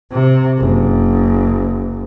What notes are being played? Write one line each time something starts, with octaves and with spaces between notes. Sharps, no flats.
C3
F#1